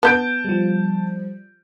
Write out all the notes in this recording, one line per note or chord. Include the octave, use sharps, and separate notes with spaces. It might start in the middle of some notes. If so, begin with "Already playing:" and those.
B3 A5 G6 D7
F3 G3